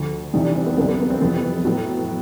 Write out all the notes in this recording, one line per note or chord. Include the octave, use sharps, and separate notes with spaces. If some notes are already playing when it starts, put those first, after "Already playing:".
Already playing: D2 D3 F3
E2 C3 E3 G3 D#4
D4
C4
B3
F#2 D3 G3 A#3
B3
B3
C4
F2 C3 E3 G3 B3
A2 F#3